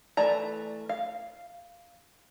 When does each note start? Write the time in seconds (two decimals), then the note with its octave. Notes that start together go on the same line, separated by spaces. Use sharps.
0.17 E3 A3 D5 A#5
0.89 F5